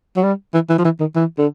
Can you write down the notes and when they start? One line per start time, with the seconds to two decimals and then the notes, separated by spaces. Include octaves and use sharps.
0.17 F#3
0.23 G3
0.54 E3
0.69 E3
0.78 F3
0.85 E3
1.00 D#3
1.15 E3
1.38 D3